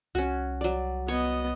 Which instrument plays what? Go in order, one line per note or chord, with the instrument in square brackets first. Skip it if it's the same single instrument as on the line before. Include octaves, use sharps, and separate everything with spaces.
[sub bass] C2 [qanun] C#4 F#4
[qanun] F#3 D5
[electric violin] B3 D#5 [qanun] C#5